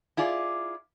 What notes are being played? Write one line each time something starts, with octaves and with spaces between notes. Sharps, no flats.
E4 F4 G#4 D5